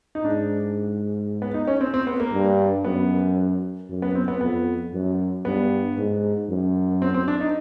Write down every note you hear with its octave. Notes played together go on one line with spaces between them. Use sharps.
D#4
G#2 D4
B3
D#4
C#4
C4
C4
B3
A#3
G2
F#2 B3
F#2
B3
C4
B3
F2 B3
F#2
G2 B3
G#2
F#2
C4
C4
D4
D#4